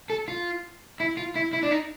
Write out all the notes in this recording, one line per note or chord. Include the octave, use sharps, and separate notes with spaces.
A4
F4
E4
F4
E4
E4
D4
D#4